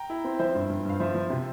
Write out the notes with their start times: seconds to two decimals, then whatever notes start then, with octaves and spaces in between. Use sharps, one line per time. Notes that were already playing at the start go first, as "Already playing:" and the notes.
Already playing: G5 A#5
0.10 E4
0.24 C4
0.39 F3 C5 E5
0.55 G2
0.69 G2
0.85 G2 F5
1.00 F3 C5 E5
1.15 F3
1.30 C3